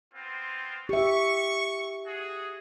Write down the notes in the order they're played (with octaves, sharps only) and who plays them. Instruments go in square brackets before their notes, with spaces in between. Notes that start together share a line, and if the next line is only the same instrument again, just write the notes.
[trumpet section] B3 C4 F4
[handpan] G4 E5 [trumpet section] C#6
[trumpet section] F#4 G#4